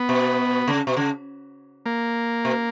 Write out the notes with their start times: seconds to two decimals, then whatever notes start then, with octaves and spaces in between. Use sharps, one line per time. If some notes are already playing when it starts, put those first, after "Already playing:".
Already playing: B3
0.09 B2
0.68 C#3
0.87 B2
0.97 C#3
1.86 A#3
2.45 B2